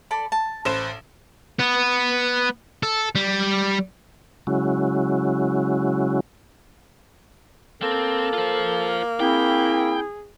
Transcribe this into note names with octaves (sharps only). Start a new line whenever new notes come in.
A4 D5 B5
A5
A1 B4 C5 E7
B3
A4
G3
C#3 F#3 G#3 C#4 E4 F#4
A#3 C4 A4
F4 C5
C4 E4 G#4 G5